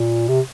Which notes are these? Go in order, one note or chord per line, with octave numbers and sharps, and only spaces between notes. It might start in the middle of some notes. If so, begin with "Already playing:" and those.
Already playing: A#2
C3